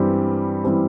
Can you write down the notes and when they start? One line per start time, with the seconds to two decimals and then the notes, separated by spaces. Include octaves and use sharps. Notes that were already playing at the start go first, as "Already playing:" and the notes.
Already playing: G2 E3 G3 C4 G4
0.64 E3 G3 C4 G4